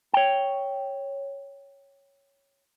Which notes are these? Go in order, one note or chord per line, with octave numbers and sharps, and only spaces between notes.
C#5 G5